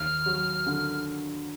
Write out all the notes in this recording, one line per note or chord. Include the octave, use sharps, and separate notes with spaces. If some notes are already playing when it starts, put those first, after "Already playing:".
Already playing: D#2 F6
F#3
D3